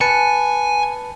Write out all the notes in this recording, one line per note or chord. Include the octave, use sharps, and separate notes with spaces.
B4 G#5 A5 C#7